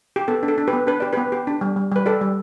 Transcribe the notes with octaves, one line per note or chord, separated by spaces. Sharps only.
G4
B3 A4
D4
A4
D4
G4 B4
B3
D4 B4
G4 D5
B3 G4 B4
G4
D4
G3
G3
G3 B4
G4 A4 D5
G3